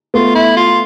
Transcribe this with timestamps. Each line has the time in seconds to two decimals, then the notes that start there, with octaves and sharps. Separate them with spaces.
0.14 A3 B3 F4
0.35 E4
0.57 F4